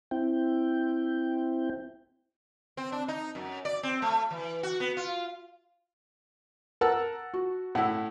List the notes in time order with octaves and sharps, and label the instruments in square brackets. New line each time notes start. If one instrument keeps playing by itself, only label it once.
[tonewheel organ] C4 E4 G5
[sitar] C4
D4
D#4
F#2
D5
C4
A3
E3
F#4
B3
F4
[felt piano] A#4 [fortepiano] F#5 A5 E6
[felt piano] F#4
[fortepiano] A2 E4 [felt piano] F#5